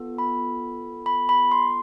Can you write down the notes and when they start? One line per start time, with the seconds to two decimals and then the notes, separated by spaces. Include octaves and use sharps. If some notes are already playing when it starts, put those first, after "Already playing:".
Already playing: B3 F4 A4
0.18 B5
1.06 B5
1.29 B5
1.51 C6